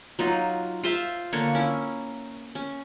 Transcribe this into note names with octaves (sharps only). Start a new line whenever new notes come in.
F#3 D#4 F4
F4 C5 E5 F5
D3 A#3 C#5
C#4 E4
C#4